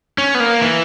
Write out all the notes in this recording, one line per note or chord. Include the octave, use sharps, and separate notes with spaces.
C#4
B3
A#3
E3